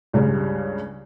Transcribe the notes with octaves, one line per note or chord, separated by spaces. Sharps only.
C#2 G2 C#3 G3 G#3